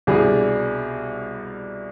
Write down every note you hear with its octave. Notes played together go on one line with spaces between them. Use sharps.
C2 B2 G3 D4 G#4